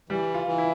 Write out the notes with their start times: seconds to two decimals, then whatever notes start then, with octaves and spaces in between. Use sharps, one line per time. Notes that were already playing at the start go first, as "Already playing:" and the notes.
0.09 E3 G3
0.34 F4
0.47 E3
0.58 E4